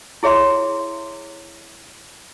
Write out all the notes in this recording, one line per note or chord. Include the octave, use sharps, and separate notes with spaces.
E4 G#4 C#5 E5 C6